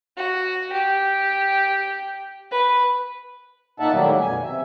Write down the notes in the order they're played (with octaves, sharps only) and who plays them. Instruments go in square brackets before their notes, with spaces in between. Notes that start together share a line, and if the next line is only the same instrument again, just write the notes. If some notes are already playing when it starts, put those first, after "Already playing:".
[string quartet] F#4
G4
B4
[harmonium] A#2 A#3 D#4 E5 F#5 A5
A2 D#3 F#3 G3 A#3
F#2 B2 G#5
C3 E5